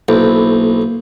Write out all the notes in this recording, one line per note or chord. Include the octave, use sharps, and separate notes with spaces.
B1 A#3 E4 A4 C5